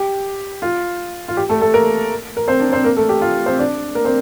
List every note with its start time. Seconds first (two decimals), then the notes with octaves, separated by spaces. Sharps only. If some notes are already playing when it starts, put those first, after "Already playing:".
Already playing: G4
0.62 F4
1.28 F4
1.37 G4
1.49 A3 A4
1.61 A3 A4
1.73 A#3 A#4
2.37 A#4
2.47 C4 C5
2.60 D4 D5
2.73 C4 C5
2.84 A#3 A#4
2.97 A3 A4
3.09 G4
3.21 F4
3.46 C4 C5
3.59 D4 D5
3.95 A#3 A#4
4.05 C4 C5